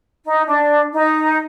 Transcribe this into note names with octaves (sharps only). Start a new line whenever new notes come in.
D#4
D4
D#4